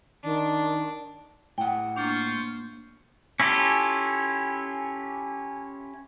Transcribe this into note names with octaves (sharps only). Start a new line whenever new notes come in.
D#3 D4
A2 F#5 G5
A#3 D4 F4 C5 C#6
C#4 E4 F4 G4 A4